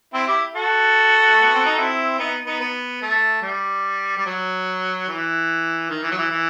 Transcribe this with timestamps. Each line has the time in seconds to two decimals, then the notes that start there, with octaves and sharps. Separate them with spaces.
0.13 C4 E4
0.27 E4 G4
0.55 F#4 A4
1.31 A3
1.42 B3
1.54 C4
1.66 D#4
1.78 C4 E4
2.19 B3 D#4
2.46 B3 D#4
2.60 B3
3.02 A3
3.42 G3
4.17 G3
4.26 F#3
5.08 E3
5.90 D#3
6.03 E3
6.11 F#3
6.17 E3
6.31 E3